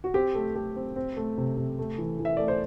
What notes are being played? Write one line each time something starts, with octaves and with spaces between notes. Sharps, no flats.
F#4
C4 G4
A3
A3 G4
C4
C4
A3
C3
C3
A3
E3
E3
E5
A3 D5
C5